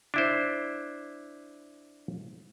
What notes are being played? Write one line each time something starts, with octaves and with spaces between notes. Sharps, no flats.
D4 E4 C5